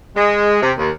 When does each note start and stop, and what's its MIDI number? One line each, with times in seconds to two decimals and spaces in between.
0.16 0.60 56
0.62 0.72 48
0.78 0.90 39